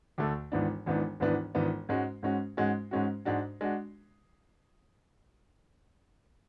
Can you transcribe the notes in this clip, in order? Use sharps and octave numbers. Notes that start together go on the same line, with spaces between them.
D2 D3 A3
G#1 G#2 E3 B3 D4
G#1 G#2 E3 B3 D4
G#1 G#2 E3 B3 D4
G#1 G#2 E3 B3 D4
G#2 G#3 C#4 F#4
G#2 G#3 C#4 F#4
G#2 G#3 C#4 F#4
G#2 G#3 C#4 F#4
G#2 G#3 D4 F#4
G#3 D4 F#4